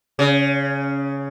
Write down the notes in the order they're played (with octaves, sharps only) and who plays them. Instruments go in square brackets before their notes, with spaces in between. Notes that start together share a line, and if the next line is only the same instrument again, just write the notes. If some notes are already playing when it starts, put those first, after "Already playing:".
[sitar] C#3